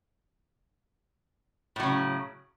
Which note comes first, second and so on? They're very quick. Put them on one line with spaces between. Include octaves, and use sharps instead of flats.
A2 F#3 C#3